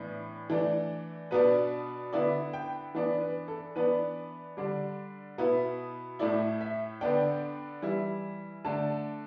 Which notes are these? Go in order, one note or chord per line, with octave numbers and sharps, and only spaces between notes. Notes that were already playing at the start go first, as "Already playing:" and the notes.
Already playing: A2 E3 B3 D4
E3 A3 D4
B2 B3 D4 B4
D3 B3 E4 D5
G5
E3 B3 D4
B4
A4
E3 B3 D4 B4
D3 G3 D4
B2 B3 E4
A2 A3 E4 D5
E5
D3 B3 D4 G5
E3 G3 E4
D3 A3 D4 A5